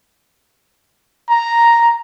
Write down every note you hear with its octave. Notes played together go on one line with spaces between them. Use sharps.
A#5